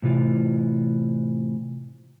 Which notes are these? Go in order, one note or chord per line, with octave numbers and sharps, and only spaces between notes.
A2 C3 E3 F4